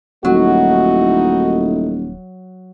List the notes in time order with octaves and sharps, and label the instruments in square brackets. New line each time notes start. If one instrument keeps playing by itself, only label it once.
[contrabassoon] D#1 [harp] F#3 [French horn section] A3 D#4 E4 [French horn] F#4